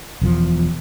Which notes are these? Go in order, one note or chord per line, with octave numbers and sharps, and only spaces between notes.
E1 E2 F3